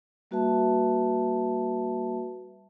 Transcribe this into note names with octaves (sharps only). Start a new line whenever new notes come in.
G3 A#3 F#4 B4 E5 A5